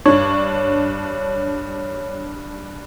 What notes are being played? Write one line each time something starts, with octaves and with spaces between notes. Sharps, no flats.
G2 D4 C#5